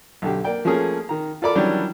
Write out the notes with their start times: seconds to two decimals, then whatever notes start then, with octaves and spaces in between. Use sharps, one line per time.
0.22 B1 D3 G4
0.44 A#3 D5 G5
0.65 F3 A3 A#3 C#4 G#4
1.09 D#3 A#5
1.42 F4 A4 A#4 D5 B5 D6
1.55 D#3 E3 F#3 G3 C#4 D4